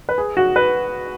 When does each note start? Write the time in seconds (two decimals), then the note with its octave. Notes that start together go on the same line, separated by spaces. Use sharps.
0.09 B4
0.18 G#4
0.37 F#4
0.56 B4